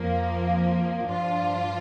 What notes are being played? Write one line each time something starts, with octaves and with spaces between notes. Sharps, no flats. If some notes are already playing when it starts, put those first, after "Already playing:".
Already playing: F2 F3 A#3 F4
G2 F3 D4 F4